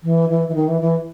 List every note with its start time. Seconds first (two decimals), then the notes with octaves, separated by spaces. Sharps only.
0.03 E3
0.30 E3
0.48 E3
0.55 D#3
0.68 E3
0.81 E3